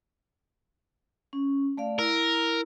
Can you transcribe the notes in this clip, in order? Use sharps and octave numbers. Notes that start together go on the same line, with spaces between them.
C#4
A3 D5 F5
E4 A#4